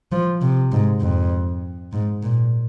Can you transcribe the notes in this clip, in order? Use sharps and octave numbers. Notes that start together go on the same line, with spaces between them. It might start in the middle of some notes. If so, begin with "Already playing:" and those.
F3
C3
G#2
F2
G#2
A#2